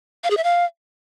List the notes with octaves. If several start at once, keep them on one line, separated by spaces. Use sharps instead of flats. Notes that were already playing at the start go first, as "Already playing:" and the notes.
F5
G#4
E5
F5